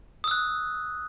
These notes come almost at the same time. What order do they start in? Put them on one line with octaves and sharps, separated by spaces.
D#6 E6 F#6